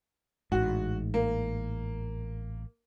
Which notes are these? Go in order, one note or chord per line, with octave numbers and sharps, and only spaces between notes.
A1 G#2 F#4
A#3